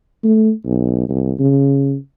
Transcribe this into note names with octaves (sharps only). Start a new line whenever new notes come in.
A3
B1
C2
C#3